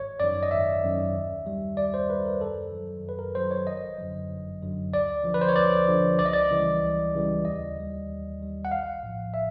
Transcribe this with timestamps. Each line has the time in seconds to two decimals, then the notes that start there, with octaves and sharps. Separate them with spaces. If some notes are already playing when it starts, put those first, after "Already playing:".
Already playing: G#1 C#5
0.20 F#2 D#3 D5
0.43 D#5
0.51 G#1 E5
0.84 F#2 D#3
1.15 D#2
1.46 D#3 G3
1.77 D#2 D5
1.94 C5
2.09 D#3 G3 B4
2.25 A#4
2.40 F#2 A4
2.72 D#3 F#3
3.04 F#2
3.09 B4
3.19 A#4
3.35 D#3 F#3 C5
3.51 C#5
3.67 G1 D#5
3.98 F#2 D3 F#3
4.29 G1
4.61 F#2 D3 F#3
4.92 D2 D5
5.24 D3 F3
5.34 B4
5.41 C5
5.48 C#5
5.56 D2 D5
5.88 D3 F3
6.19 C#2 D5
6.26 D#5
6.33 D5
6.51 C#3 E3 G3
6.82 C#2
7.14 C#3 E3 G3
7.45 D#2 D#5
7.76 D#3 G3
8.09 D#2
8.40 D#3 G3
8.65 F#5
8.71 A#1 F5
9.03 A2 F3
9.34 E5